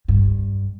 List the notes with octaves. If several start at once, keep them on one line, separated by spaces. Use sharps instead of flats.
G2